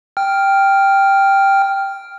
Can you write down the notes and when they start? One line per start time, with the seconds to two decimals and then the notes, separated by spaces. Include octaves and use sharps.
0.17 G5 F6